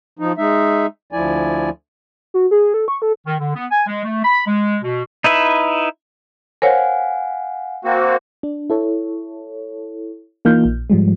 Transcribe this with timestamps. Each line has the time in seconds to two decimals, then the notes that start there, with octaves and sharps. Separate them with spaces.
0.19 F3 D#4
0.38 G#3 D#4 E5
1.13 D2 F3 E4 D5 G#5
2.34 F#4
2.51 G#4
2.74 A4
2.88 C#6
3.02 A4
3.26 D#3
3.39 D3
3.55 B3
3.72 G#5
3.87 G#3
4.04 A3
4.24 B5
4.47 G#3
4.82 B2
5.24 D#4 E4 B4 E5
6.62 A#4 C5 C#5 F5 F#5 G#5
7.85 A#3 C4 F#4
8.43 D4
8.70 E4 A4 C#5
10.45 E3 A#3 D#4 F4 F6 G6
10.65 A#1
10.90 G#2 F3 G3 G#3